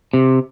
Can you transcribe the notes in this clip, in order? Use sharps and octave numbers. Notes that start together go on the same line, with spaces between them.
C3